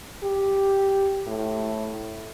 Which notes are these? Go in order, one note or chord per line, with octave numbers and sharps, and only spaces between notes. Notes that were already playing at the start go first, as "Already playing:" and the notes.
G4
A2